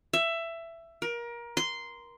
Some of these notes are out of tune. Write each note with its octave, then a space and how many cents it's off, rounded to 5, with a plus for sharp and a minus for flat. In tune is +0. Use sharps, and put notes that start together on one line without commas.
E5 +15
A#4 +25
C6 -10